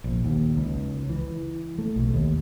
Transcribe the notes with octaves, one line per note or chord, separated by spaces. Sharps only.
A#1
D#2
C#2
E3
A3
B1
D#2